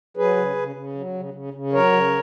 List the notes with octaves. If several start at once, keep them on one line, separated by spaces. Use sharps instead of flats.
F#3 G#4 B4
C#3
C#3
C#3
F#3
C#3
C#3
C#3
F#3 A#4 C#5
C#3